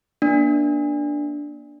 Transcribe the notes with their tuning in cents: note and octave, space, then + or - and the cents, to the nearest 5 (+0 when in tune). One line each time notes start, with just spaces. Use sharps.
A#3 +40 D4 +0